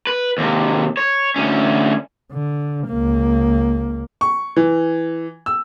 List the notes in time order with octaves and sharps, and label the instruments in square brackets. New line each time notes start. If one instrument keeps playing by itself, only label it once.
[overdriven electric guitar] B4
D#2 C3
C#5
D2 C#4
[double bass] D3
C#2 A#3
[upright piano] C#6
E3
E6